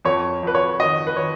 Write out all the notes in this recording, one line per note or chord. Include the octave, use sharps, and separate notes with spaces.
F2 C#5
F2 B4
C#5
D#3 D#5
B4
D#3 C#5